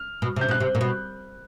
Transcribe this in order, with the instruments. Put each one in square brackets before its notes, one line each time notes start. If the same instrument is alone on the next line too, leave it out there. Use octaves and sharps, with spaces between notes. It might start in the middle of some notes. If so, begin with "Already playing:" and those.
Already playing: [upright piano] F6
[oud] B2
[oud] C3 [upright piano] G6
[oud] B2 [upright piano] F#6
[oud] C3
A#2
B2